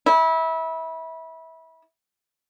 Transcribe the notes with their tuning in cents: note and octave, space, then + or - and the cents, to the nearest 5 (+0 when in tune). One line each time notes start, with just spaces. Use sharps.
E4 -25